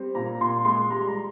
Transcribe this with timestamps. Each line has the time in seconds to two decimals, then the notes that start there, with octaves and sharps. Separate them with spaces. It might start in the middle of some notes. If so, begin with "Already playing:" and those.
Already playing: G3 C4
0.15 A#2 A#5
0.40 A#2 C6
0.65 G#3 C6
0.90 G3 A#5
1.07 A#5